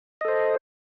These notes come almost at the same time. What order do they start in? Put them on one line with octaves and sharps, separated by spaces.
D#5 A4 C5